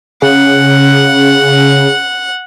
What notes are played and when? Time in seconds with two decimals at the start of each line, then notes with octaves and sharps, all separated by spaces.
0.22 C#3 F#5